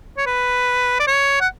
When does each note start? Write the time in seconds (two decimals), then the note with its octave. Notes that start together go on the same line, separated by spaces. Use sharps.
0.17 C#5
0.26 B4
1.00 D5
1.07 C#5
1.41 F#5